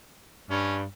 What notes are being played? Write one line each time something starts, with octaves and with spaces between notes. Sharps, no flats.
G2 C#4